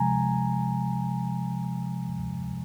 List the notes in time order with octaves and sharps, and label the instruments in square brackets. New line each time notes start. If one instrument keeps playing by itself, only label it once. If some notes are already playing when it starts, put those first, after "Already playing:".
Already playing: [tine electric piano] C3 F3 G#3 G#5 A#5